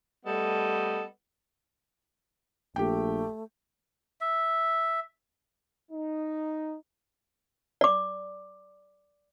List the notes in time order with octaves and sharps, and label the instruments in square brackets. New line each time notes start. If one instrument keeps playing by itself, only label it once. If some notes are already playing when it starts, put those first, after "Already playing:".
[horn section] G3 A3 B3 A4 D#5
[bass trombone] A#1 [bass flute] A3 [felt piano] G4 G5
[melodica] E5
[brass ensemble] D#4
[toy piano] D5 D6